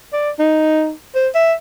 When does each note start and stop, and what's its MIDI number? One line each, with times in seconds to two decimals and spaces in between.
0.13 0.30 74
0.39 0.91 63
1.15 1.28 72
1.35 1.53 76